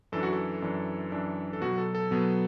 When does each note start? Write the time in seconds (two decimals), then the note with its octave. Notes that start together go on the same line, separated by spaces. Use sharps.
0.12 F#2 E3 D4 A4
0.23 F#4
0.33 A4
0.62 F#2 E3 D4
1.12 F#2 E3 D4
1.53 A4
1.61 B2 F#3 B3 F#4
1.78 A4
1.95 A4
2.11 B2 F#3 B3